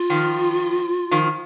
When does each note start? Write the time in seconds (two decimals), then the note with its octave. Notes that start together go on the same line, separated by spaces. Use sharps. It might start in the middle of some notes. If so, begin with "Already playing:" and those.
Already playing: F4
0.10 D#3 F3
1.11 D#3 F3